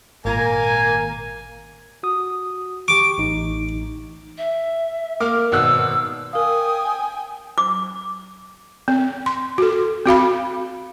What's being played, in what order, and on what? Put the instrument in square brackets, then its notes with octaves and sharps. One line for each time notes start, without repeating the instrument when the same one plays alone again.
[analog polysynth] G#1 A#2 A#5 [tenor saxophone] A#3 [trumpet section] G#5
[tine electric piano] F#4 D#6
[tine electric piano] G4 C#6 [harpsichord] D6
[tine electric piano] A1 D#4
[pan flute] E5
[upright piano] A#3 D6 F6 [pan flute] A#4
[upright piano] G#1 B2 F#6 [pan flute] E6
[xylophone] A#4 F5 [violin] G5 G#5 [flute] D#6
[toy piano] D6
[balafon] C4
C6
F#4 A4
C4 F#4 F5 B5